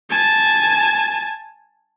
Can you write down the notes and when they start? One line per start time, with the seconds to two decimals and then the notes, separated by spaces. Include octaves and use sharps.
0.10 G#5 A5